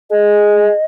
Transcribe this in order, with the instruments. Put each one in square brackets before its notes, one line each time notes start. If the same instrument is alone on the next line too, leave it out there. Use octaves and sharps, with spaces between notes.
[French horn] G#4 [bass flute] D#5